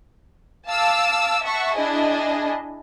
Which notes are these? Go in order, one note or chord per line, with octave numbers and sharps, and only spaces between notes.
F5 A5 D6 E6
E5 F#5 A5 C#6
D4 E4 G#4 D#5